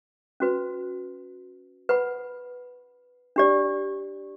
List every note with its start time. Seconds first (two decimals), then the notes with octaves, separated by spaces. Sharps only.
0.40 C#4 F#4 B4
1.89 B4 F#5 B5
3.36 D4 G4 D5